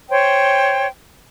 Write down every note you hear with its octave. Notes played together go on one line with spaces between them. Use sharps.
C5 C#5 G5